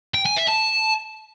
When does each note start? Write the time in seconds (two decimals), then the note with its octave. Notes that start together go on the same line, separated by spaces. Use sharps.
0.14 G5
0.25 G#5
0.36 E5
0.47 A5